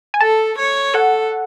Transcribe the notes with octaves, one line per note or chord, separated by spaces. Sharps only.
G#5
A4 A5
C#5
A4 F#5